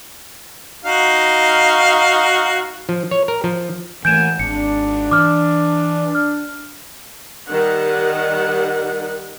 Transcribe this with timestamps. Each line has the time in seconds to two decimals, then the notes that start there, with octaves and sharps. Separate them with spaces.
0.85 D#4 F#4 F5
2.89 F3
3.11 C#5
3.28 A#4
3.44 F3
4.05 E3 A3 A#3 F#5 G#5 G6 D7 E7
4.39 G#1 D4 C#7
5.11 E3 D6 F6
6.15 F6
7.49 D#3 G3 F#5